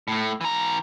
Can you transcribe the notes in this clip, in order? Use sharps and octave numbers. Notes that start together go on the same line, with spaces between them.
A2 A3
E3 A#5